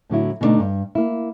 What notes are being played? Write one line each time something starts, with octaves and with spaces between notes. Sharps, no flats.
A2 D3 F#3 E4
B2 D3 G3 A3 D4 D#4
G2
A#3 E4